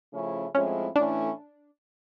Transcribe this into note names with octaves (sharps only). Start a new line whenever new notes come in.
C#3 F3 A3 C#4 E4
A2 F3 G#3 C4 C#4 E4
A2 E3 A3 C#4 D4 E4